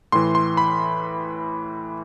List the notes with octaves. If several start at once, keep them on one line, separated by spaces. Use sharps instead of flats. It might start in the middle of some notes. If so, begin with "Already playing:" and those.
A2 E3 C6
C6
B5